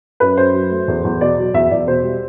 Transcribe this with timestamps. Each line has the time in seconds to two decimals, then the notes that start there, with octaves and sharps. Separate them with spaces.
0.20 F#2 B4
0.37 F#2 C5
0.54 F#3
0.71 A3
0.88 E2
1.04 E2
1.21 B2 D5
1.38 F#3
1.54 E2 E5
1.71 E2 D5
1.87 B2 C5
2.04 G3